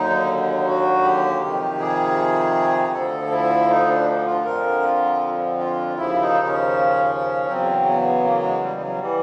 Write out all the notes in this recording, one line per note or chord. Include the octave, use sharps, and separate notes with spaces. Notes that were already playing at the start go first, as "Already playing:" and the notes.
Already playing: D#2 D3 F#3 D#4
F#4
G4
F2 C3 D#3 G4
G#4
D2 D3 F3 A4
E4
D#4
D4
F4
F2 D3 F3 A#4
F4
F4
D#2 C#3 F3 E4
D#4
C#4
E2 C#3 F#3 C4
B3
A#3
G#3
G3
F#3
E3 G3